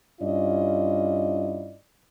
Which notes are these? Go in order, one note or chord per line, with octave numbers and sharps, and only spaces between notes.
G2 C#4 E4 F4 D5 D#5